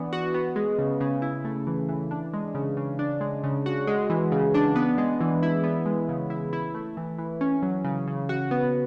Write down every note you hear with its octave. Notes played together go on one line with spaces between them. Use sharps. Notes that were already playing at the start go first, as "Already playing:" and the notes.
Already playing: E3 B3 D4
F#4
B3
G#3
C#3
C#3
E4
A3
E3
E3
D4
G#3
C#3
C#3
D4
G#3
C#3
F#4
G#3
E3
C#3
D4
B3
G#3
E3
E4
B3
G#3
C#3
E4
E4
A3
E3
E3
C#4
F#3
C#3
C#3
F#4
B3